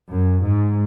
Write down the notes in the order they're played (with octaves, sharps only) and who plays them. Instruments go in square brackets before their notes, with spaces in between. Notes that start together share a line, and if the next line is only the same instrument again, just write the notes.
[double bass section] F#2
G#2